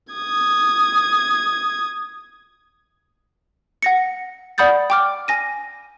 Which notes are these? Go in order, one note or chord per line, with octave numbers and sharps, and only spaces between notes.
D#6 G#6
F#5 A#6 C#7
D5 F#5 B5 D#6 G6 A6
G5 D6 F6
G#5 A#6 D#7